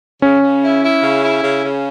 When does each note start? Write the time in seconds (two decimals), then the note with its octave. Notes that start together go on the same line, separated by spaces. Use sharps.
0.22 C#3 C#4
0.43 C#3
0.63 E4
0.82 E4
1.02 C#3
1.23 E4
1.43 C#3
1.64 C#3